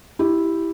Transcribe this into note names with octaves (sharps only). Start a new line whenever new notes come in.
E4 G4